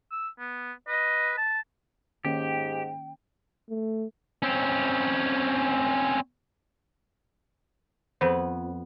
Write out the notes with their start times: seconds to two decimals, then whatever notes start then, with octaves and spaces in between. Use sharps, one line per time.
0.12 E6
0.39 B3
0.88 B4 D#5
1.37 A5
2.25 G#2 D#3 A#3 C#4 G4 G5
3.70 A3
4.43 C4 C#4
8.21 F2 B3 C5